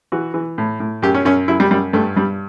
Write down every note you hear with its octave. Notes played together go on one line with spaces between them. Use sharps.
E3 F#4
E3
A2
A2
F#2 G4
C#4
F#2 C#4
F#2 E4
G3
F#2 G3
G2 A3
G2 G3